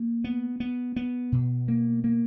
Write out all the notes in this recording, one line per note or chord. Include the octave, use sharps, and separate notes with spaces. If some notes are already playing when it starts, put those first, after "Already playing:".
Already playing: A#3
B3
B3
B3
B2
A#3
A#3